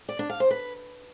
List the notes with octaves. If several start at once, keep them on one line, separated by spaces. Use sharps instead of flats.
D5
D4
F5
C5
B4